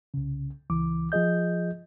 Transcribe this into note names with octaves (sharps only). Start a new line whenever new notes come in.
C2 C#3
C#2 E3 D6
F3 F4 G#4 D#5 G6